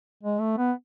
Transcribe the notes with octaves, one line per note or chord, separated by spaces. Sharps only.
G#3
A3
B3